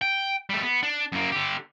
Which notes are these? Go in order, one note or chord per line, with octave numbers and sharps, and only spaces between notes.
G5
G3 A3
B3
D4
F#2 A#3
D3 G4